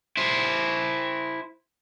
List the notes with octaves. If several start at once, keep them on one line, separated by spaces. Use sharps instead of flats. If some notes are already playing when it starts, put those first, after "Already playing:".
E4 C5